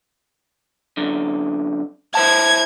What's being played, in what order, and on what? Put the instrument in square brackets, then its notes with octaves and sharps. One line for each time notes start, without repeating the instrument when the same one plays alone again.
[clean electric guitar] F#2 D3
[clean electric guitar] E4 C5 A5 [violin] G#6